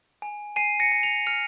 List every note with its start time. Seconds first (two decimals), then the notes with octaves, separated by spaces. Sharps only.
0.22 G#5
0.56 G#5 C7 D#7
0.80 A#6 C#7
0.92 G#5
1.03 C#7 F7
1.26 F6 C#7 F7